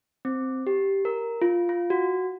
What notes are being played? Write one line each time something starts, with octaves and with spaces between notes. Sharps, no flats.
C4
G4
A#4
F4
F4
F#4